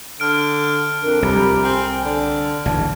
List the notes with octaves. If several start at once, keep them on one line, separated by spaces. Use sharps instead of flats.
D3 F6 D7
F2 D4 A#4
C2 G4 A#5 B5
C4 G5 G#5
D3 D5
B1 D3 E3 A5